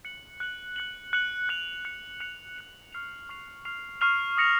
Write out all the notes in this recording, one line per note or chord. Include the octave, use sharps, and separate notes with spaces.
F#6 C#7 F#7
F#6 C#7 F#7
F#6 C#7 F#7
F#6 C#7 F#7
F#6 C#7 F7
F#6 C#7 F7
F#6 C#7 F7
F#6 C#7 F7
C#6 F6 C7 F7
C#6 F6 C7 F7
C#6 F6 C7 F7
C#6 F6 C7 F7
D#6 A#6 C#7 F7